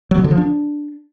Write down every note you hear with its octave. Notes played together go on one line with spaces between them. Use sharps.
F#3
B2
D3
F3
D4